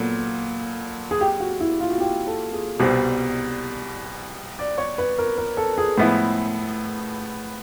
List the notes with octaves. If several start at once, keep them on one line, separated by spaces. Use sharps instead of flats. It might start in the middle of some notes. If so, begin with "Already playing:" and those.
Already playing: A#2 F#3 B3 A4
G#4
G4
F#4
E4
F4
F#4
G4
A4
G#4
C2 B2 G3 C4 G4
D5
C#5
B4
A#4
A#4
A4
G#4
A2 F3 G#3 B3 E4 B4